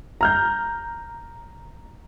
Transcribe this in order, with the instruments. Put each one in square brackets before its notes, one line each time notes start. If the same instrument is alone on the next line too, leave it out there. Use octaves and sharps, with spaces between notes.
[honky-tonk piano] A#5 F6 G6